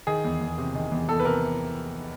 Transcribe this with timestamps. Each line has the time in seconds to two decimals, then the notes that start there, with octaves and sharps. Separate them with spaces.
0.07 D#3 G#4
0.24 E2
0.41 E2
0.58 C3
0.75 D#3
0.92 E2
1.08 E2 A4
1.19 B4
1.25 C3 A#4